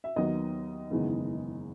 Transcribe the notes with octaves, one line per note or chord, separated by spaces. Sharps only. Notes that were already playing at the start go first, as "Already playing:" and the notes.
E5
D#2 D#3 F#3 B3 D#5
F#1 E2 D#3 G#3 B3